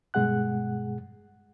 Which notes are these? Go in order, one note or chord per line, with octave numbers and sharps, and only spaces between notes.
G2 B2 G#3 G#4 F#5 F#6